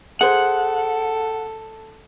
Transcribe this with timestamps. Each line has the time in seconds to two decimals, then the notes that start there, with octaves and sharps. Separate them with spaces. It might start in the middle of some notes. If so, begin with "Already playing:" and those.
0.21 G#4 A4 C5 F#5